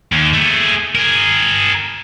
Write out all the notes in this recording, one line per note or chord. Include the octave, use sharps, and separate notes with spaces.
D#2
A3 G#4
G#4 A#4